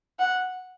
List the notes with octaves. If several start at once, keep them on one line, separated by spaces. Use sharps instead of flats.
F#5